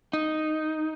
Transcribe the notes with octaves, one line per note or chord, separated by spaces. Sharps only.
D#4